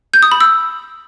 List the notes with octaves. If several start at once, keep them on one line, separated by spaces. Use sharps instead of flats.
G6
D#6
B5
E6